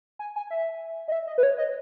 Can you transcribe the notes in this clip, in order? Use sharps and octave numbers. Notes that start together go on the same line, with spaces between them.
G#5
G#5
E5
D#5
E5
D#5
B4
C#5
D#5